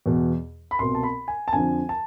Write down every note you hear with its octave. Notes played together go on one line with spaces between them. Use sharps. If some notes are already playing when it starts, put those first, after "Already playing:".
E2 B2
B5
C2 B2 C6
A5
B5
G#5
A5
F2 D3 F3 G#5
A5